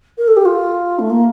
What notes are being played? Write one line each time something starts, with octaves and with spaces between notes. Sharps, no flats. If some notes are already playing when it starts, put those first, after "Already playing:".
A#4
A4
G4
F4
A3
A#3